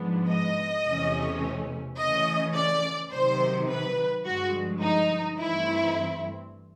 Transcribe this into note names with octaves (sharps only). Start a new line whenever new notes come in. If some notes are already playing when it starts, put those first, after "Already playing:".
Already playing: G#2 F3 G#3 B3 D4
D#5
E2 C3 E3 A3 C#4
C#3 E3 A3 C#4 D#5
D5
C3 D#3 F#3 C5
B4
G2 D3 F3 G#3 F#4
D#4
G2 E3 A3 C4 E4